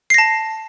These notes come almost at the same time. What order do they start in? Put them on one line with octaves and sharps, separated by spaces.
C7 A#6 A5